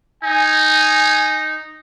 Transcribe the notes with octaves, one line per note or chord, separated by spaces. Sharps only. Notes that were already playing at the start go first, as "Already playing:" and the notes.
D#4 G#5